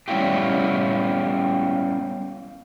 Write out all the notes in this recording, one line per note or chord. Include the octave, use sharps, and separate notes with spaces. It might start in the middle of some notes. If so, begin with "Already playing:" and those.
G3 B3 C#4 E4 F4 G4